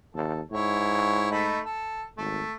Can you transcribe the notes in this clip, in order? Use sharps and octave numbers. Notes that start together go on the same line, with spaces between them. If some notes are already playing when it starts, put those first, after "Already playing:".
D#2 A4
G#2 E4 C#5
A3 D#4 B5
A4
G#1 A3